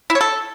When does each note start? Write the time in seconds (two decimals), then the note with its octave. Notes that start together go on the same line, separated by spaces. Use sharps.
0.10 E4
0.15 C#5
0.21 A4